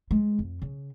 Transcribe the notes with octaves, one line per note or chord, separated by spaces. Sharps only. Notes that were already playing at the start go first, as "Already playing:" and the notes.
G#3
F2
C#3